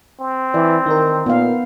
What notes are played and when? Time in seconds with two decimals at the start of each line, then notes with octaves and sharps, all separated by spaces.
0.20 C4
0.54 E3 D5
0.86 D#3 D#4 A#4
1.26 A#2 B3 F5